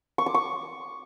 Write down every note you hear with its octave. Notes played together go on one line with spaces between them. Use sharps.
C#6
D6
C#6